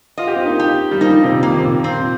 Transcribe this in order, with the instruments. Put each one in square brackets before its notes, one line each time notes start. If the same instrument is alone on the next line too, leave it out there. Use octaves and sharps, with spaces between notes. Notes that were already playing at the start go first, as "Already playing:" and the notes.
[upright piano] F4 [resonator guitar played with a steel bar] D#5
[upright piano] G4
C4 F4
A#3 D#4
[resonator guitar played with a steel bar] G4
[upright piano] G3
[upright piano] F3 A#3 [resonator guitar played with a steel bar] D#4
[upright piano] C3
A#2 D#3
[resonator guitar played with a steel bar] A#3
[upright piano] C3
A#2
A#2
[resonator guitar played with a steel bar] C4